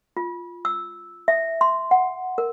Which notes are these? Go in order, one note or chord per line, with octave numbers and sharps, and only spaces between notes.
F4
E6
E5
C6
F#5
A#4